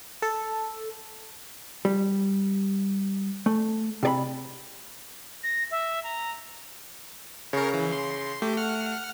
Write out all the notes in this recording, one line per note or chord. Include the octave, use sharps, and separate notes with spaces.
A4
G3
A3
C3 D5 B5
A#6
E5
A#5
C#3 A#4 C#5
E3
C6
A3 G4
F#5 F6